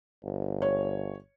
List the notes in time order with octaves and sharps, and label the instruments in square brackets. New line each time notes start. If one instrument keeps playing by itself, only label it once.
[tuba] G1
[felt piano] C#5